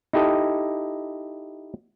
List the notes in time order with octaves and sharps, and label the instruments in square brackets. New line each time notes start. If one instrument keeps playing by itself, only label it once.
[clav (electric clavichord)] D#4 E4 G4 A4 D#5